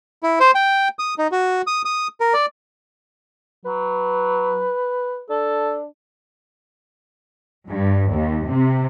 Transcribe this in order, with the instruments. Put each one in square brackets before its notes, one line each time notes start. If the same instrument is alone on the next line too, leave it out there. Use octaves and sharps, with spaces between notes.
[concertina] E4
C5
G5
D#6
D#4
F#4
D#6
D#6
A#4
D5
[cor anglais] F#3 [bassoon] B4
[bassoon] D4 [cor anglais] A4
[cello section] G2
D#2
C3